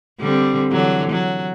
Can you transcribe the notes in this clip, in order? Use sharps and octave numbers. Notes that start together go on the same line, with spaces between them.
D3 G3 C4
D3 E3 F#3
F#3